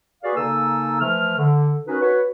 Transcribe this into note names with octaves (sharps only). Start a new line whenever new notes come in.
F#4 G#4 B4 D5 F5
C#3 A#3 D#4 A4 G#5 E6
E3 F3 A3 F6
D3
C#4 D#4 F#4 A#4 B4
F#4 B4 C#5